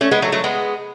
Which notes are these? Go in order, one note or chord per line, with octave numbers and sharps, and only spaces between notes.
A3 C#4
G#3 B3
F#3 A3
F#3 A3
G#3 B3